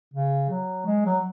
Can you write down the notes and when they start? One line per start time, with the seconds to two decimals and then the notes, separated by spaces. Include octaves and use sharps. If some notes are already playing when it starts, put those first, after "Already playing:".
0.14 C#3
0.50 F#3
0.86 G#3
1.05 F#3